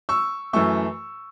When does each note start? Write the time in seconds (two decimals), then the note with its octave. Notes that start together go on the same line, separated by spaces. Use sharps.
0.09 C#6 E6
0.53 F#2 E3 A3 C#6 E6